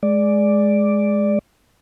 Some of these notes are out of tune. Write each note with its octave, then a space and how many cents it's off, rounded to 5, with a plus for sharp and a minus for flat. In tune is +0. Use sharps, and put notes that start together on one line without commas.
G#3 +10 D5 +0